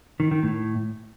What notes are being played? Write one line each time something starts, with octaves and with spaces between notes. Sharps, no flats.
D#3
D#3
A2